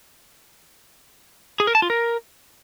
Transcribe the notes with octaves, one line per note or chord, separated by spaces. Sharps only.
G#4
A#4
A5
F4
A#4